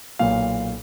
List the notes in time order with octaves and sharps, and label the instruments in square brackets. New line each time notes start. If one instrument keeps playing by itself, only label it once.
[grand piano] B1 A#2 F5